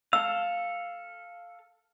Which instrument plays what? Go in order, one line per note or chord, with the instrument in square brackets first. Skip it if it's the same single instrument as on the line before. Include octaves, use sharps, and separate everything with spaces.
[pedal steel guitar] A4 F5 [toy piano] E6